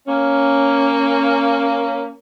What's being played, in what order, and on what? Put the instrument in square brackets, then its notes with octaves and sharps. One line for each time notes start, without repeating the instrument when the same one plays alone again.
[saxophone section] A#3 C#4